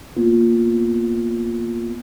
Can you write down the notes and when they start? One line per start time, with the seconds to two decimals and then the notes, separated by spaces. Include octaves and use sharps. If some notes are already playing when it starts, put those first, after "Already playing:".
0.17 A#3 B3 F4